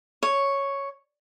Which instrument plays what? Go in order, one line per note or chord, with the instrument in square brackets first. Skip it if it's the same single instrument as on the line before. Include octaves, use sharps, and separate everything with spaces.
[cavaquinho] C#5